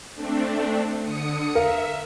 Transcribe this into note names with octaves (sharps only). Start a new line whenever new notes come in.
A3 C4 D4
D3 D#6 C#7
A#4 E5 F5